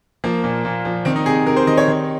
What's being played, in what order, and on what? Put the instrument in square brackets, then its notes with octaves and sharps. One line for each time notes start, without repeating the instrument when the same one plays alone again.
[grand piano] F3 A#3
A#2
A#2
F3
D#3 C4
D#4
C3 G#4
C3 A#4
C5
D#3 D#5
C#5
D#3